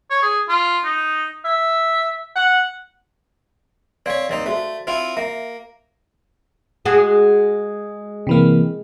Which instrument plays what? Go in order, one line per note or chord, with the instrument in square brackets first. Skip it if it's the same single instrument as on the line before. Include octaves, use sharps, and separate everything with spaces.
[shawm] C#5
G#4
F4
D#4
E5
F#5
[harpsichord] C4 C#5 [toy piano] D5 F5
[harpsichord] D#2 C4 D#4
[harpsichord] A3 [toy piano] F#4 C5
[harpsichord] C4 E4 F4
[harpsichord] A#3 [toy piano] E5
[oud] G#3 F#4 G#4
[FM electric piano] C3 E3 A#3